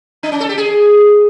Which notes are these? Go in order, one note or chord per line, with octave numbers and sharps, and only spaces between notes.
D4
C#4
A4
G4
G#4